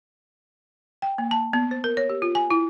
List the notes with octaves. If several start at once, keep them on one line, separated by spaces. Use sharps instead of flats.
G5
A#3
A5
B3
C5
A#4
C#5
G4
F4
G#5
E4